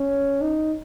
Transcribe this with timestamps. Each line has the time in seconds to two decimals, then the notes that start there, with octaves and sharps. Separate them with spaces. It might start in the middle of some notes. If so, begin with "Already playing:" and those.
Already playing: C#4
0.41 D#4